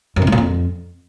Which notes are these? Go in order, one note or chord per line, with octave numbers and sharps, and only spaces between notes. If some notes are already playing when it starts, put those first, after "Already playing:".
F#2
C3
A2
A#2
F2